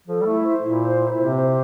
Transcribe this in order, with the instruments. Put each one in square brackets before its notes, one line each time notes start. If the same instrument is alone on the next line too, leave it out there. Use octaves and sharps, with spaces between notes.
[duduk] F3 [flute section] A4
[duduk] G3
[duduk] A3 [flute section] E4
[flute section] C5
[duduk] A#2 [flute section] E4
[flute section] C5
E4
[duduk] C3 [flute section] C5
[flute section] C5